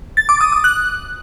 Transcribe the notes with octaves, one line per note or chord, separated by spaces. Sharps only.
A6
D6
D#6
D#6
F#6